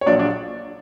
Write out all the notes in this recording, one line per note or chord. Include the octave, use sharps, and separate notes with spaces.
C#5
A#1 A#2 F#3 D4 D5
D4 D5